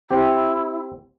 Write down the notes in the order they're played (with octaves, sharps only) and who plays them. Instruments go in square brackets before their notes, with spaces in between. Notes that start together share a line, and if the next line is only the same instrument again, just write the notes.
[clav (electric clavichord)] C4 G4 [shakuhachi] E4